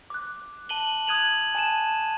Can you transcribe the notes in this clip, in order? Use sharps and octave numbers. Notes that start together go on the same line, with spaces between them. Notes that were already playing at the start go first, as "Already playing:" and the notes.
D6 F#6
A5 D#7 F#7 G7
D#6 F#6 G#6 D#7 F7 F#7
G#5 A5 D#7 E7